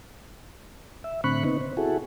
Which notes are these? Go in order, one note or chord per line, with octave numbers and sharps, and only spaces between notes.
E5
A2 D3 C4 B5 C#6 F#6
C#3 B3 C4 D#4
C5
E4 F#4 G#4 A4